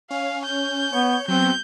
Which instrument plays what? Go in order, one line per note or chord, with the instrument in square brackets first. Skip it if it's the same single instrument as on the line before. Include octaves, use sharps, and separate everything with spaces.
[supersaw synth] C#4 [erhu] F5
[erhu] G6
[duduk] B3 [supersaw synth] C#5
[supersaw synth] F#3 B3 [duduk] C4 [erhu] G6